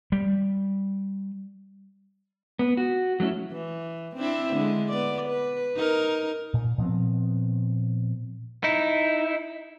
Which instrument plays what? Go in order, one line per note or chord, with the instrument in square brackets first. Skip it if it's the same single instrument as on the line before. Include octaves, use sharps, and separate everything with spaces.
[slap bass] G3
[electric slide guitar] B3
F#4
F#3 A3 C#4 E4
[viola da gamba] E3
C4 D4 E4
D3 G#3
B3 D5
B4
D#4 A#4
[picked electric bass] A#2
A#2 F3 B3 C4
[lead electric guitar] D#4 E4